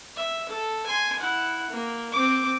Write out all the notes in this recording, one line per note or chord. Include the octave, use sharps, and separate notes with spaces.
E5
A4
G#5 C6
E4 F#5
A#3
C4 D6